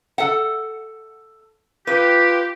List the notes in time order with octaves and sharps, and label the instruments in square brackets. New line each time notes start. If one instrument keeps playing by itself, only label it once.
[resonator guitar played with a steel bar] A4 F#5
[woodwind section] F4 G4 [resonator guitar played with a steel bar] B4